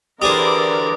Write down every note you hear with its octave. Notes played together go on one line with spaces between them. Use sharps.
D3 E3 G4 G#4 A#4 C5 D5 D#6